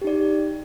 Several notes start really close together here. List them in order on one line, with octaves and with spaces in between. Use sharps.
G4 D#4 D5